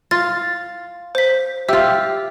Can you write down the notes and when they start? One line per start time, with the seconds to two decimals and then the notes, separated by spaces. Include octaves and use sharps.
0.11 F4 A6
1.15 C5 B6
1.69 F4 G4 E5 E6